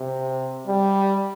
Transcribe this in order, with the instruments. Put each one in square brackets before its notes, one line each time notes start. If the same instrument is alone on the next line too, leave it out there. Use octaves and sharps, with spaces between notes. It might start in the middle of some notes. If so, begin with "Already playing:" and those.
Already playing: [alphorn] C3
G3